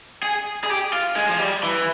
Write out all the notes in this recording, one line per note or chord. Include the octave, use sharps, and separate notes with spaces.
G#4
G#4
G4
F4
G#3
F3
G3
E3